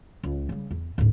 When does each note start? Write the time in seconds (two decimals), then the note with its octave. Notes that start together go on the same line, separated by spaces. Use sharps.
0.23 C#2
0.49 C#3 G3
0.71 E2
0.98 D1 G#2